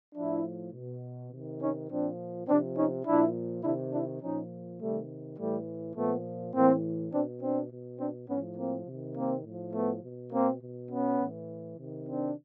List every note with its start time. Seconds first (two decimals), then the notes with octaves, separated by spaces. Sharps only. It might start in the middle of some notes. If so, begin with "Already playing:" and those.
0.15 A2 F3 D4 E4
0.73 B2
1.31 C3 D#3
1.61 C#4 D#4
1.89 A#2 F3 C4 D4
2.48 F3 C4 D4
2.53 C3
2.76 C#4 D#4
3.06 A#2 F3 D4 E4
3.63 C3 D#3 D4 E4
3.92 D4 E4
4.21 A#2 F3 C#4 D#4
4.80 C3 D#3 G3 A3
5.38 A2 E3 G3 A3
5.96 A#2 F3 A3 B3
6.54 A2 E3 A#3 C4
7.13 B2 C4 D4
7.41 C4 D4
7.70 B2
7.99 C4 D4
8.28 A2 F3 B3 C#4
8.57 A#3 C4
8.87 C3 D#3
9.16 A#3 C4
9.45 A2 F3
9.74 A3 B3
10.03 B2
10.32 A#3 C4
10.61 B2
10.89 B3 C#4
11.19 A2 E3
11.77 C3 D#3
12.06 C4 D4